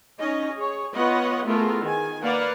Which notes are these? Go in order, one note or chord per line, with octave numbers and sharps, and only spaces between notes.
C#4 D#4 D#5
G#4 C#5
B3 F4 B4 C#5 D#5 F#5
A3 B3 E4 F4 G#4 A#4
D#3 G#4 G#5
A#3 B4 D5 F5 F#5